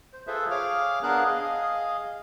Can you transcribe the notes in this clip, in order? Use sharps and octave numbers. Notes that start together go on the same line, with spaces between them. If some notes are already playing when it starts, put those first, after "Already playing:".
C5
F4 G#4 A4 B4 C5 E5
G#4 C#5 F5 D6 F6
B3 D4 G#4 A#4 F5 F#6
G#4 D#5 F5